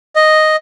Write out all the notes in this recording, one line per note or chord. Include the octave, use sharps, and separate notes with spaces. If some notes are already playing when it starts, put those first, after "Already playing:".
D#5